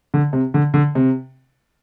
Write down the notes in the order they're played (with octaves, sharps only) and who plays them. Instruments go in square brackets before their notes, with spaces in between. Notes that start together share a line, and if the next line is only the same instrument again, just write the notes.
[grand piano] D3
C3
D3
D3
C3